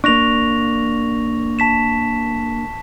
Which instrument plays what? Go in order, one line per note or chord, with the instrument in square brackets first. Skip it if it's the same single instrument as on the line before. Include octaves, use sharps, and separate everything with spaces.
[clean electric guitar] A#3 D4 [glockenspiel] C#6 A#6 F7
[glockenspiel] A5 B6 E7